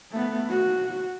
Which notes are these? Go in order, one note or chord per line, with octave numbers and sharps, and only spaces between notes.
A3 B3
F#4